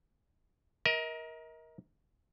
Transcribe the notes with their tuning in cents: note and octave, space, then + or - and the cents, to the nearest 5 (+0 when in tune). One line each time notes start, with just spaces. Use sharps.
A#4 +20 D#5 +40